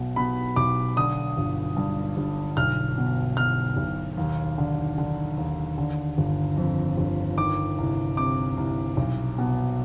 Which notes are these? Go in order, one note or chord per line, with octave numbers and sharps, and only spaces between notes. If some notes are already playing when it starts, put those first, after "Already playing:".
Already playing: B1 B2
B2 B5
B1 D6
D3 D#6
G1
G2
G1
B1 F6
B2
B2 F6
B1
D#2
D3
D3
D#2
D3
G1
F2
G1
D#3 D6
C2
C3 D6
C2
B1
B2